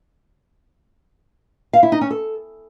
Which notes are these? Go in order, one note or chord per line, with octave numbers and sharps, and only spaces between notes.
F5
E4
D#4
C#4
A4